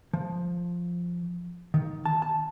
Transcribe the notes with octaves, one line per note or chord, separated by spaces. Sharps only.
F3
D#3
A5
A5